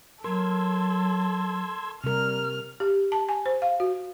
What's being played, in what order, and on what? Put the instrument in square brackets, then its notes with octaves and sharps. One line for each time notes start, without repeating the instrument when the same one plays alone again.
[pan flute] F#3 [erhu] A4 [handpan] A#4 [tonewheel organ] C6 E6 G#6
[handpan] C3 A#4 [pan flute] G3 [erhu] F6
[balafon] G4
A5
G#5
C5
F5
F#4